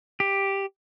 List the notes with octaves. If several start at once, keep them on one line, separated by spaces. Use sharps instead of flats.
G4